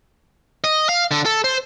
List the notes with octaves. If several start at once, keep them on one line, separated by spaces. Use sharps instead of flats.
D#5
F5
D3
A4
C5